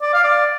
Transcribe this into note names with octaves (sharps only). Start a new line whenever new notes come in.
D5
F5
D5